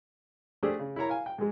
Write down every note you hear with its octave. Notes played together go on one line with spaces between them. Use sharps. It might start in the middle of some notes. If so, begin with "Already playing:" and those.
A3 D4 G4 G#4 C5 D5
C#3
E4 A#4 C#5 A#5
F5 G#5
G5
G#2 G#3